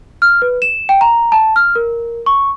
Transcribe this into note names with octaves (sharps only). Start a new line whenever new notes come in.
F6
B4
E7
G5
A#5
A5
F6
A#4
C#6